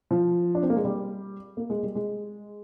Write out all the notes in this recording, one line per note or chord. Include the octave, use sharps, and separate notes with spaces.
F3
D4
C4
A#3
G#3
G3
A#3
G#3
G3
G#3